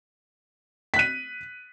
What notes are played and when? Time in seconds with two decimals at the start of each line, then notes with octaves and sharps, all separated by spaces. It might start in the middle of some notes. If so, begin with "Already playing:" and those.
0.94 B6
0.96 F#6
0.99 D#7